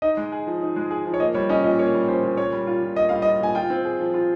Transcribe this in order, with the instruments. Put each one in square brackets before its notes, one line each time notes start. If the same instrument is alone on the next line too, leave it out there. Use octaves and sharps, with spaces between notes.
[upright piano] D#4 [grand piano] D#5
[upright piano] G#3
G#4
F3
D#4
G#3
G#4
F3
[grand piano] C#5
[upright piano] A#3 [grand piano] D#5
[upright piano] G3 [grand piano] C#5
[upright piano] C#4 [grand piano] D#5
[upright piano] A#2 [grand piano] D#5
[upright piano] A#3 [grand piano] C#5
[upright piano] G3
[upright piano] C#4 [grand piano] C5
[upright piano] A#2
[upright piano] A#3 [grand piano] C#5
[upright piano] G3
F4
A#2
[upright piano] A#3 [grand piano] D#5
[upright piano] G3 [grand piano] F5
[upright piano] F4 [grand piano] D#5
[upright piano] A#2 [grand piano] G#5
[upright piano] F4 [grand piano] G5
[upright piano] C4
G#4
F3
F4